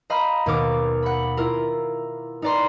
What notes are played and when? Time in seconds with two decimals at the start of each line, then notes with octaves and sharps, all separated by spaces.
0.10 D#5 F5 A#5 B5 F6 G6
0.46 D#2 B2 B3 A#4 D6
1.03 F#5 B5
1.37 E4 F4 A#4
2.42 D#4 B4 D5 A#5 C6